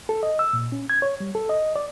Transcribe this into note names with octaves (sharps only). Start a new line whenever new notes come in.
A4
D#5
E6
A#2
C#4
G#6
C#5
G3
A4
D#5
D5